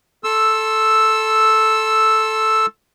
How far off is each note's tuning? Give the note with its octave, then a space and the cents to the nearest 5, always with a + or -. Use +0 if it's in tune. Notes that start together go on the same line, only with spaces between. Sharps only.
A4 -5 C6 +25 E6 +0